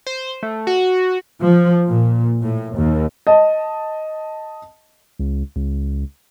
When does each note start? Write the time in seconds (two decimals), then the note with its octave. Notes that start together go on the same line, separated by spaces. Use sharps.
0.07 C5
0.43 A3
0.67 F#4
1.42 F3
1.89 A#2
2.42 A2
2.77 D#2
3.27 D#5 A5
5.19 C#2
5.56 C#2